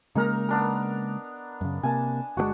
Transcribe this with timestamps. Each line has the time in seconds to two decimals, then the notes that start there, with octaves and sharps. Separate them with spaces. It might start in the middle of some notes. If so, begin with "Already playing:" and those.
0.15 C#3 G#3 A#3 D#4 A#4 A#5
0.49 B3 D4 A#4
1.61 F#2 C#3
1.83 C3 A#3 G#5 A5
2.37 G1 B2 G#3 D4 F#4